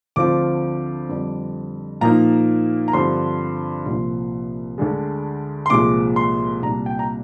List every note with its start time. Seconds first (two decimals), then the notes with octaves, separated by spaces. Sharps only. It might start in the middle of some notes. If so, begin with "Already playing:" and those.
0.16 D2 D3 F3 C4 F4 D6
1.09 F2 D3 G3
2.01 A#2 F3 A#3 D#4 A#5
2.88 A#5
2.93 G2 D3 F3 C4 C6
3.85 C2 A#2 F3
4.78 D2 D3 G#3
5.66 C6
5.70 C2 A#2 F3 G#3 D6
6.16 C6
6.62 C2 A#2 G3 D4 A#5
6.86 G5
6.99 A#5